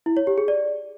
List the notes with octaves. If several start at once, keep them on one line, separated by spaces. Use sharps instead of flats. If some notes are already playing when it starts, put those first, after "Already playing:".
E4
C#5
G4
G#4
D5